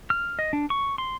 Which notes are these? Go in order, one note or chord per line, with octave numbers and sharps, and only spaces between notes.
F6
D#5
D4
C#6
C6